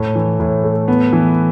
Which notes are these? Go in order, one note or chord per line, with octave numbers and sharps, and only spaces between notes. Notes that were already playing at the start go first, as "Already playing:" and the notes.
Already playing: A2 A3
E3
A2
A3
B3
E3